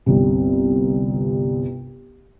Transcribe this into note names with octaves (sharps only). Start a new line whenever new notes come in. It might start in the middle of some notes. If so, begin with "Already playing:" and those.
G1 C2 C3